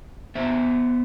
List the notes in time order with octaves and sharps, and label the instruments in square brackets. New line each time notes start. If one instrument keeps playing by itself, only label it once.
[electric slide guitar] B3 C5 E5